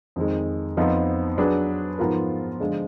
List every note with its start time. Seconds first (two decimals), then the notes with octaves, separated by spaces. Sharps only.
0.16 F2 D#3 G#3
0.77 F2 F3 B3 D#4
1.38 F#3 D4 G#4 B4
1.99 G#2 F3 B3 F4 A#4
2.60 D3 F3 G#3 D4